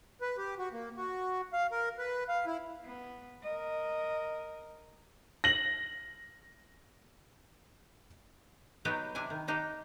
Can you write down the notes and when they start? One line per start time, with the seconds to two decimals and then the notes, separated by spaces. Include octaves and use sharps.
0.21 B4
0.38 G4
0.59 F#4
0.72 A#3
0.97 F#4
1.53 F5
1.72 A#4
1.99 B4
2.29 F5
2.46 E4
2.85 B3
3.42 A#4 D#5
5.44 A#6 F#7
8.85 F#3 B3 D#4 G4 C#5 D5
9.15 C3 D4 E4 G#5
9.30 D#3
9.47 A#3 D4 D#4 G4